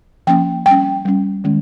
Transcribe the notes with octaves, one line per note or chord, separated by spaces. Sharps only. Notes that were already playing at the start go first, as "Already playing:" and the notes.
F3 A#3 C#4 G5
G3 C#4 G5
G3 C#4
D#3 G#3 C#4